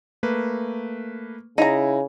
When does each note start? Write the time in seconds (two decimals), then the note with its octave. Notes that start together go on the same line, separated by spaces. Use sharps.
0.23 A3 A#3 B4
1.58 C#3 D#4 E4 A#5